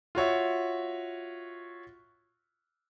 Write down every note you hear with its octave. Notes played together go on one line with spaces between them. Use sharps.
F4 F#4 C#5 E5